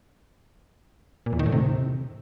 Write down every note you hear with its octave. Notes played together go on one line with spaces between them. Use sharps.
A#2
E2
D#3
A2
C3